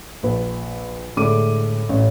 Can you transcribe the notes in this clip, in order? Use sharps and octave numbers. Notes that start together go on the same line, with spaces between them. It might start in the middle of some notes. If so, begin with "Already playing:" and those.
A#1 B4
A2 D3 G#3 A3 D6 D#7
A1